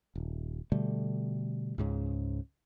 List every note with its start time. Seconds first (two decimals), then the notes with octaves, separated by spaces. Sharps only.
0.15 D#1
0.72 B2 D3 G3 A3
1.78 C#2 G#2 C#3